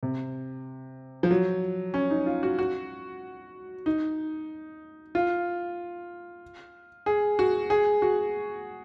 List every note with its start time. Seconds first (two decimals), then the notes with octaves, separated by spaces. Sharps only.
0.03 C3
1.23 F3
1.31 F#3
1.94 C#4
2.10 D#4
2.26 F4
2.43 F#4
2.59 F#4
3.86 D#4
5.15 F4
7.06 G#4
7.39 F#4
7.70 G#4
8.02 F#4